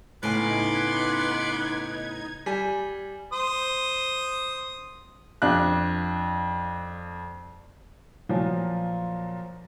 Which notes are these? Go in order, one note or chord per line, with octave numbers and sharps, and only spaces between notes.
A2 C#3 B3 D#4 G#5 C6 D6 G#6
G3 G#5
C5 D#6
F2 D4 F#6
A#2 F3 F#3